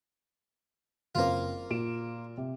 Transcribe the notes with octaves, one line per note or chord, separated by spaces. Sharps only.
F#1 A#3 C4 F4 C5
A#2 D7 E7
C3